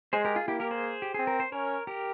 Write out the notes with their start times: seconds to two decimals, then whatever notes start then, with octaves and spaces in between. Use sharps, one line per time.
0.13 G#3 G#4 C5
0.25 G4 A#4
0.36 F4 G#4
0.48 A#3 E4 G4
0.60 G4 A#4
0.71 G#4 C5
1.02 G4
1.14 C4 G#4
1.27 A#4
1.40 C5
1.52 C#4 A#4 C#5
1.87 G4 A#4